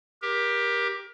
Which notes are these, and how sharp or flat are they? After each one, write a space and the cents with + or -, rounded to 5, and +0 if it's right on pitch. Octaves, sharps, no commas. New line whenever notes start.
G4 +10 A#4 +25